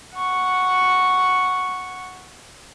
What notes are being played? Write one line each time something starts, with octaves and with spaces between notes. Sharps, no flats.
F#5 C#6